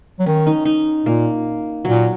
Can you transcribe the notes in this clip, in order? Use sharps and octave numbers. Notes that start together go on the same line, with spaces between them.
F#3
D#3 C#4
D#4
D#4
A#2 A#3
A#2 F#3